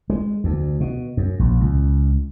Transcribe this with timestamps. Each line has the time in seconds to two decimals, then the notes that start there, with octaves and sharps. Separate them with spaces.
0.10 G#3
0.44 D2
0.80 B2
1.17 F#2
1.39 A#1
1.61 C#2